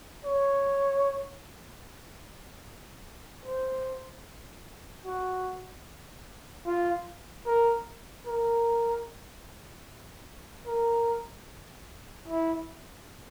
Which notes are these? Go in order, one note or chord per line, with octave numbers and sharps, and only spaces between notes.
C#5
C5
F#4
F4
A#4
A#4
A#4
E4